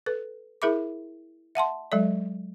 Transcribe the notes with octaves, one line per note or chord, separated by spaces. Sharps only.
A4 B4
E4 G#4 A#4 E5 B5 D6
E5 F#5 A5 C6
F#3 G#3 A4 D5